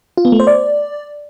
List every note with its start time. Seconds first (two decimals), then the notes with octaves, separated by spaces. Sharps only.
0.17 F4
0.25 B3
0.32 A3
0.40 C5
0.47 D5